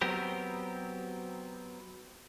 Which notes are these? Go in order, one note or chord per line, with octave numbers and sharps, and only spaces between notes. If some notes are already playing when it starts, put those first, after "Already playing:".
F#3 B3 C4 G4 A#4